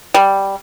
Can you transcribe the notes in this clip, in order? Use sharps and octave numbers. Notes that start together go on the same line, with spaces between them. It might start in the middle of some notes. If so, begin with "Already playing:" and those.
G3